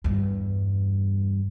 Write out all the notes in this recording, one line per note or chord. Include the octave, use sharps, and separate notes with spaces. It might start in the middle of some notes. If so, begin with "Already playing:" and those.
E2 G2